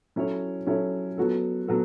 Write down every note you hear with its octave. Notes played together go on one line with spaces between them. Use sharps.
F#3 C#4 E4 A4 C#5
F#3 C#4 E4 A4 C#5
F#3 B3 F#4 A4
F#3 B3 F#4 A4